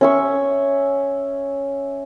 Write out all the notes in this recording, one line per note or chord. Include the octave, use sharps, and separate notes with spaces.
C#4 E5 C#6